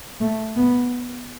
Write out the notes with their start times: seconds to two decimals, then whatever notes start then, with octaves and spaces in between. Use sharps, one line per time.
0.21 A3
0.56 B3